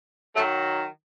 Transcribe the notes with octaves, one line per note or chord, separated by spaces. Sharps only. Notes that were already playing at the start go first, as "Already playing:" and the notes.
D#3 F#3 A3